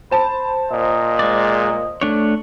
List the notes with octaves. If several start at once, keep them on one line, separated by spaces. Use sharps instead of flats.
C5 A5 B5
A#2 D#5
G#3 D5
A3 D4 C#5